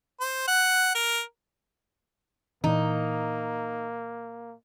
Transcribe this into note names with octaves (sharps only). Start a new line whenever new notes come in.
C5
F#5
A#4
A#2 E3 A#3 D#4